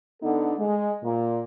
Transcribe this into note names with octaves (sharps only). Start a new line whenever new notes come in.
D3 B3 D#4 A4
G#3
A#2